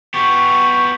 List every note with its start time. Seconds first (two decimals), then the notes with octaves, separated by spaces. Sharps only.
0.14 B3 G4 C#6